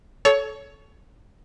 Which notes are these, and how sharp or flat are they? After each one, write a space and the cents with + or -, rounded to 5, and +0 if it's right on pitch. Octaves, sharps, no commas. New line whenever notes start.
A4 -20 C#5 +15